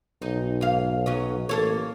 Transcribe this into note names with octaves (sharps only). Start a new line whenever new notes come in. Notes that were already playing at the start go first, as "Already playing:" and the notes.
B1 D#4
G#2 F5
F#3 C#4 D#5
A1 A#3 A4 C#5